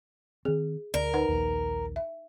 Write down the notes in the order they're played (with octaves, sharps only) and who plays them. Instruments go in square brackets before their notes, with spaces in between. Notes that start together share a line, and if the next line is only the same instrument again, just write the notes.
[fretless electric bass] D#3 C4 [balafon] G#4
[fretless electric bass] D2 [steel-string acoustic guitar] A#4 [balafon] D5
[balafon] D#4 B4 F#5
[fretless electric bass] A#1 D#2
[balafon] E5